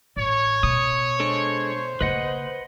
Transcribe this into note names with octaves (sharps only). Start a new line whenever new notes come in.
A1 C#5
B2 D#6
G#3 D4 A4 C5
C#3 A#3 B4 D#5 F#5